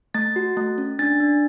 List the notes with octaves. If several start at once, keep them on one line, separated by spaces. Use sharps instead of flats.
A3 A6
F#4
A3
C#4
D4 A6
D4